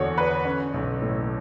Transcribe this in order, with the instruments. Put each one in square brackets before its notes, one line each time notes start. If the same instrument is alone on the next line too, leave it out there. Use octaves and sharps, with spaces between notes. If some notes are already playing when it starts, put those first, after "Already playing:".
Already playing: [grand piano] E2 D3 F#4 C#5
D3 B4
C#4
B1
A2